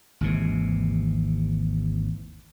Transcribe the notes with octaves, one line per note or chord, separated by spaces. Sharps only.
G#1 D#2 C3 E3